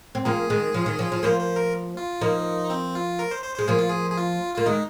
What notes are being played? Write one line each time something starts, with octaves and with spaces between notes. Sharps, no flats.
C4
F3 A#3 G#4
D#3 G#3
F3
D#3
F3
F3
F3 A#3 C5
C5
A#4
F4
F3 A#3 D#4
C4
F4
A#4
C5
C5
G#3 C5
F3 A#3 G#4
F4
G#4
G#4
F4
A#3 F4
D#3 G#3 D#4